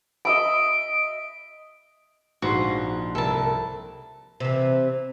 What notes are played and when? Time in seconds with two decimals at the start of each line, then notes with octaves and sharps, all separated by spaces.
0.25 D#5 E5 B5 D7
2.42 A#1 G#2 F#4 C5 C6
3.15 C2 A4 A#4 A5
4.40 C3 E3